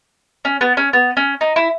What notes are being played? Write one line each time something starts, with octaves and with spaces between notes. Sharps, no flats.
C#4
B3
C#4
B3
C#4
D#4
E4